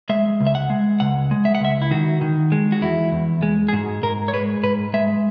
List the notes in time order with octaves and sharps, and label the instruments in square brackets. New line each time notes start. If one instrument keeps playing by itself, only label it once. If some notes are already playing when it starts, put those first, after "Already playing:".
[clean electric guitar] G#3 E5
C#2
E5
F#5
G#3
C#2 F#5
G#3
E5
F#5
C#2 E5
E4
D#3 F#4
D#3
G#3
F#4
E2 E4
E2
G#3
G#4
G#2 F#4
G#2 A#4
C#5
G#3 B4
G#2 B4
G#3 E5